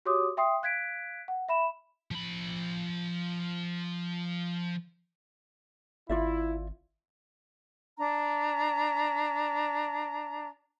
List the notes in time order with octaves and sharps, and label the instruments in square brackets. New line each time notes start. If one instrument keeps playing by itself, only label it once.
[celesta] F#4 G4 C#5 C6 D6 D#6
E5 G5 C6 D#6 C7
F5 F#6 G#6 B6 D7
F#5
E5 B5 E7
[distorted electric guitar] F3 B5
[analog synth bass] G#1 [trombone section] E4 [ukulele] F4 D5 E5
[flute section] D4 A#5